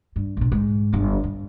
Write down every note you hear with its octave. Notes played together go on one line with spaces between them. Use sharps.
G2
A#1 B2
G#2
G1 F2
G2